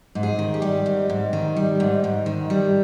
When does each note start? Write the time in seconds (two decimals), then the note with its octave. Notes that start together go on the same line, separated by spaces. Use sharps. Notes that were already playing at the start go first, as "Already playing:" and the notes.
0.15 G#2
0.23 G#4
0.39 D#3
0.54 G4
0.62 G3
0.86 G#2
1.10 G#2
1.33 D#3
1.56 G3
1.80 G#2
2.04 G#2
2.26 D#3
2.50 G3